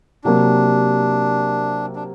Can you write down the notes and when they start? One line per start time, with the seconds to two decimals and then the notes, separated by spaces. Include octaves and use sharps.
0.24 C3 F#3 A#3 D4
1.96 D4